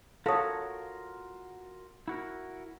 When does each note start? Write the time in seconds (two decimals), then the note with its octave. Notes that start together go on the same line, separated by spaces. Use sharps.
0.26 F4 F#4 A4 A#4 C#5 F5 D#6
2.08 E4 F#4 A#4